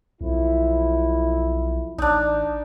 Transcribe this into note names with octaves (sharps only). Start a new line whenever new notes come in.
B1 F2 E4
A1 D4 D#4